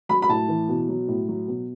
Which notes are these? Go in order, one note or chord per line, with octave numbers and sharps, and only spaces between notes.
F#3 B5
B5
A2 A5
E3
B2
F#3
A2
F#3
B2